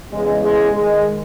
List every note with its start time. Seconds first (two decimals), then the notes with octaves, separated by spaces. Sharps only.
0.12 E2 C#3 E3 G#3
0.42 G#3
0.72 G#2 D#3 G#3